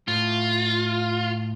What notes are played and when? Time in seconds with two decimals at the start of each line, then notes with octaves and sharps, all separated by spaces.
0.08 A2 F4